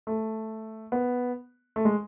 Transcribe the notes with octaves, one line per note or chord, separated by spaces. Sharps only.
A3
B3
A3
G#3